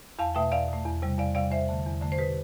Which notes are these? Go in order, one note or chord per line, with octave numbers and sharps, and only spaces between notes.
E2 F5 A5
B2 A3 E5 G5
E2 D5 F5
B2 A3
E2
C3 G3
E2 D5 F5
C3 G3 D5 F5
E2 C5 E5
D3 A3
E2
D3 A3
C5
B2 G4 B4